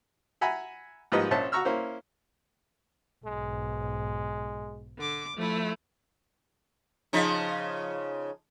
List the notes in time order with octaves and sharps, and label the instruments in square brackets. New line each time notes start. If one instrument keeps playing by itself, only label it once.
[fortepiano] E5 F#5 G#5 A#5 B5
G#2 F3 G3 A#3 B4 D#5
A#1 C#4 C5 E5 A5
F#4 A#5 C#6 E6 F6
A#3 C#4 E4 C5
[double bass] B1 G#2 [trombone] G#3
[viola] D3 D6
[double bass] F3 [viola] A3 E4
[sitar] C#3 F3 D#4